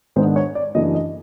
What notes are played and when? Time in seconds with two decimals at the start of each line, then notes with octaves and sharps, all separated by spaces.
0.16 G#2 D#3 G#3 B3 D4 C5
0.36 C#5
0.55 D5
0.75 F#2 C#3 E3 A3 D4 D#5
0.95 D#5